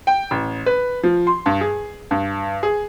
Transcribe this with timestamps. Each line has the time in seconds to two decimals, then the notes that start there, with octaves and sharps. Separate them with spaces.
0.07 G5
0.31 A1
0.66 B4
1.03 F3
1.27 C6
1.46 G2
1.61 G#4
2.11 G2
2.63 G#4